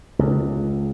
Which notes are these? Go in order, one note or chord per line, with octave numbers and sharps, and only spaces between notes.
C#2